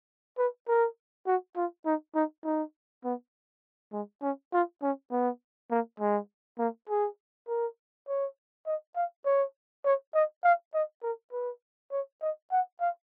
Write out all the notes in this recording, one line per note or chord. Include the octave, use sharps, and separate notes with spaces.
B4
A#4
F#4
F4
D#4
D#4
D#4
B3
G#3
C#4
F4
C#4
B3
A#3
G#3
A#3
G#4
A#4
C#5
D#5
F5
C#5
C#5
D#5
F5
D#5
A#4
B4
C#5
D#5
F#5
F5